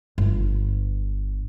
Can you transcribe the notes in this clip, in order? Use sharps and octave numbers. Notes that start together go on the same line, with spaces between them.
G1